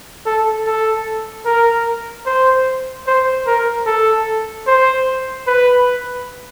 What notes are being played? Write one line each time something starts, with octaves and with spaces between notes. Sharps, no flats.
A4
A4
A#4
C5
C5
A#4
A4
C5
B4